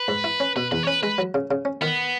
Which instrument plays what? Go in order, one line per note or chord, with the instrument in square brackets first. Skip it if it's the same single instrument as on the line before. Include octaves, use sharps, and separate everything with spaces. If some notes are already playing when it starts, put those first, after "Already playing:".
Already playing: [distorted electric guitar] B4
[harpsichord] G#2
E4
C#4
[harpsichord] B2 [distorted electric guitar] B4
[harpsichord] E2 [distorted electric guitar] B4
[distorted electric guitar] C#5
[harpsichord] C#4 [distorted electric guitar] B4
[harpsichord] G#3 [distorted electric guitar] B4
[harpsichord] F#3
C#3
C#3
C#4
[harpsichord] D#3 [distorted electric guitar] B3